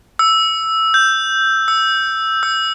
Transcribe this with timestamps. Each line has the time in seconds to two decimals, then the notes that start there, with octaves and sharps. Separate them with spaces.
0.19 E6
0.94 G6
1.68 E6
2.43 E6